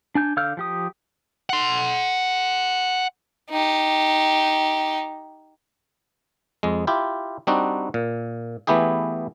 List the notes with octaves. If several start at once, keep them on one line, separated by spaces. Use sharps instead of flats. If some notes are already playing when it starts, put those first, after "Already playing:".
D4 G#5 G6
D3 F5 E6 F6 G6
F3 G4 D#6
F#5 C6
D#4 G4
F2 G#3
E4 F4 G4
G3 C4 D4 D#4 F#4
A#2
E3 A3 B3 E4 G4 G#4